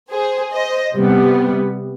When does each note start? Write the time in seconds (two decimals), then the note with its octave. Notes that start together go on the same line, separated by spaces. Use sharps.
0.12 G#4 C5
0.53 C5 D#5
0.94 C3 G3 B3